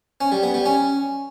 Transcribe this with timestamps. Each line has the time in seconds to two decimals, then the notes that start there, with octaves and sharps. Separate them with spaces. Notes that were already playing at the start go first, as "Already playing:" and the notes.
0.21 C#4
0.32 G3
0.43 B3
0.54 G3
0.65 C#4